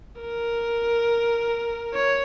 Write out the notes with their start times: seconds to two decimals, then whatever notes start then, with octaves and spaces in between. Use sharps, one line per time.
0.21 A#4
1.94 C#5